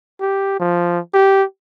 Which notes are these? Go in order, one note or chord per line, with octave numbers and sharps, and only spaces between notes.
G4
F3
G4